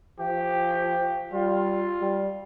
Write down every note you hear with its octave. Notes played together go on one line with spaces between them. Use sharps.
F3 G4
G3 F4
G3